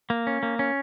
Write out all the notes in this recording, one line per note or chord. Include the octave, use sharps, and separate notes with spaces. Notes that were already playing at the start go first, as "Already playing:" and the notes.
A#3
C#4
A#3
C#4